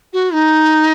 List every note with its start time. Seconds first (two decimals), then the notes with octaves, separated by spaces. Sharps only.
0.13 F#4
0.33 D#4